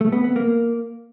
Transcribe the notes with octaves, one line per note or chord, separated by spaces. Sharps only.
A3
B3
B3
A#3